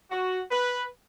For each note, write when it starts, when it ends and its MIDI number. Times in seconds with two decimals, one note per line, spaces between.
0.11 0.41 66
0.51 0.85 71